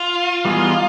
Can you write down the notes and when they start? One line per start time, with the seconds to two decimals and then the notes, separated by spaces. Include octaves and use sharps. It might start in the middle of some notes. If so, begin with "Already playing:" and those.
Already playing: F4
0.45 E3 G3 B3 D#4 G#4